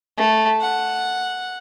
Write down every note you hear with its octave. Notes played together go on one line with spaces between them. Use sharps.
A3
F#5